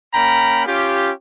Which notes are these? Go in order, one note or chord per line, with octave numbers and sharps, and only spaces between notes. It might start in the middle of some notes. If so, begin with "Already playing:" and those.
A#3 C#4 G5 A#5 B5
C#4 F4 G4